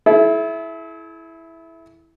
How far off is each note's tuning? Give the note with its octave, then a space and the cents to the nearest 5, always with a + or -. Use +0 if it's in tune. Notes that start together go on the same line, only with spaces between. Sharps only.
E4 +0 A4 -45